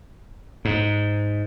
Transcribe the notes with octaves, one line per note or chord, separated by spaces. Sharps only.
G#2